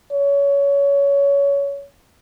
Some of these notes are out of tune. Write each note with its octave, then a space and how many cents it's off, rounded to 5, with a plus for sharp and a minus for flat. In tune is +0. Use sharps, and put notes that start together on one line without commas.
C#5 +20